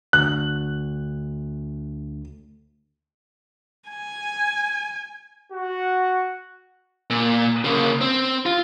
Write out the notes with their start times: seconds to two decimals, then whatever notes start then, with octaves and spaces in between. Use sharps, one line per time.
0.13 D2 F#6
3.90 G#5
5.52 F#4
7.10 A#2
7.65 C#3 A#3
8.01 C4
8.46 F4